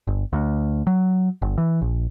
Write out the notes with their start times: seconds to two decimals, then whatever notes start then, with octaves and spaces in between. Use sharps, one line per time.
0.07 G1
0.33 D2
0.87 F#3
1.42 G1
1.58 E3
1.81 A#1